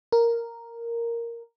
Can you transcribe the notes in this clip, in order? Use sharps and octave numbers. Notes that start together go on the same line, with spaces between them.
A#4